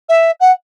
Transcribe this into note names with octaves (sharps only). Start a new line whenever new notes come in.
E5
F#5